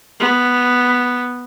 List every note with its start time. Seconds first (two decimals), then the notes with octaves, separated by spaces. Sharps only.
0.20 B3